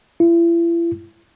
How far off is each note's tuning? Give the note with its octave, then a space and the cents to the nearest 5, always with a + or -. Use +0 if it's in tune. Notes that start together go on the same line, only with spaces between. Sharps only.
E4 +40